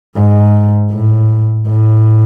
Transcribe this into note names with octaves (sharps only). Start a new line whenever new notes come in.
G#2
A2
A2